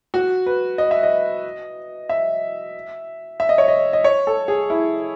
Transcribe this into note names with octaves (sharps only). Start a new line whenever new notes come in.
F#4
B4
D#5
E5
D#5
E5
E5
D#5
C#5
D#5
D#5
C#5
A4
G#4
E4